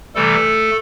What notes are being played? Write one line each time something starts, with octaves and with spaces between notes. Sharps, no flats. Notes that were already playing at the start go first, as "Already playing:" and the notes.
C3 E3 G3 A3 A4